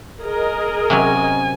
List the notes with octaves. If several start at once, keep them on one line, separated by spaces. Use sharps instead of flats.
G#4 A#4 D#5
C3 F#3 C#4 G#5